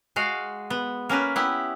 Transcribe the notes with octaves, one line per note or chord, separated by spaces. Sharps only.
G#3 F#4 F5
B3
A#3 C#4 A#4 B4
B3 E4 G4